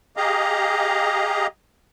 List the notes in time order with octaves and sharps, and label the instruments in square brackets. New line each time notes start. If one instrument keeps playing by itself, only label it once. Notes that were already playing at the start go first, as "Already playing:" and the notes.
[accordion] G4 G#4 D#5 F5 A#5